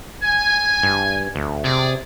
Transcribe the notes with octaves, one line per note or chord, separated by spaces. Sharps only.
G#5
G2
D2
C3 G#4 D5